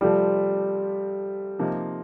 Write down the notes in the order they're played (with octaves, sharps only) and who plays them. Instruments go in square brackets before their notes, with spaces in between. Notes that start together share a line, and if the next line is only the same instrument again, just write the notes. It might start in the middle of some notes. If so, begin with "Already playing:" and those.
[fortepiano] C3 F3 A3 C4 F4 [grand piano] G3
[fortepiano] C3 F3 A#3 D#4